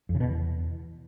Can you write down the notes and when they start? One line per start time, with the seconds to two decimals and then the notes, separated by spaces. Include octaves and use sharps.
0.09 F2
0.15 C#3
0.20 B2
0.26 E2